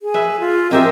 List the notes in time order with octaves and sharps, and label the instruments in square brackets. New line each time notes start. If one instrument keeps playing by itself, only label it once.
[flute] G#4
[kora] B4 E5
[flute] F4
[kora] G#3 G4 E5 [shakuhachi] C4 [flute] A#4